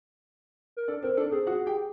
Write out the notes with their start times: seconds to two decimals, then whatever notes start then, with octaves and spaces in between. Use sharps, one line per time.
0.77 A#4
0.88 D4 A4 D5
1.03 C4 A#4 C5
1.13 A#4
1.17 D4 A4 D5
1.32 C4 G#4 C5
1.47 F#4 F#5
1.66 G4 G5